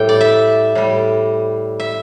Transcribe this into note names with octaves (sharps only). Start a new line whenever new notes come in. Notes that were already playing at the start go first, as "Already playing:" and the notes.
Already playing: A2 G3 G5
D5
E5
A2 G3
E5